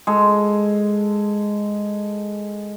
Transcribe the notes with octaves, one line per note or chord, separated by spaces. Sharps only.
G#3 A4